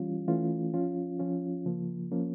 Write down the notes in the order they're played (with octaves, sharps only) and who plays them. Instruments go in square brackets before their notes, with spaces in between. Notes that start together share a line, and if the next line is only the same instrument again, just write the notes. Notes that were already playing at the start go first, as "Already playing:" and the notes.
Already playing: [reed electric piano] E3 G3 C#4 F4
E3 A3 C#4 F4
F3 C#4 F4
F3 C#4 F4
C#3 F3 A#3
F3 A#3 C#4